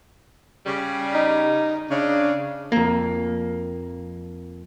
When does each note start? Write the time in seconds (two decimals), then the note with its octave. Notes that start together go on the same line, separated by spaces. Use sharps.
0.66 C#3 G3
1.14 D#4
1.90 C#3 D4
2.72 F2 A#3